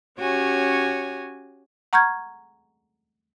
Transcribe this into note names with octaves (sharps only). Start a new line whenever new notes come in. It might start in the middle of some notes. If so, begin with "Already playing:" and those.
C#4 F#4 G4 C#5 G#5
F#5 A#5 C#6 F6 G6 G#6